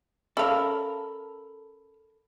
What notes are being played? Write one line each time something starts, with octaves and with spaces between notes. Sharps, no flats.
C#4 A4 A#4 F5 A5 B5 E6